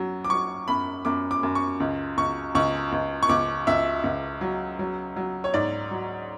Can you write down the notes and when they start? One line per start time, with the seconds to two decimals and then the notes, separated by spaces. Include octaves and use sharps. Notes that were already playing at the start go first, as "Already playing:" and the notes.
Already playing: F#2 F#3
0.25 D6
0.30 F#3 C#6
0.68 F#2 B5
1.05 F#2 D6
1.31 D6
1.43 F#2
1.55 C#6
1.80 C#2
2.17 C#2 C#6
2.55 C#2 C#6
2.92 C#2
3.23 C#6
3.29 C#2 D6
3.67 C#2 E5
4.04 C#2
4.41 F#3
4.79 F#3
5.16 F#3
5.44 C#5
5.54 G#2 D5
5.91 F#3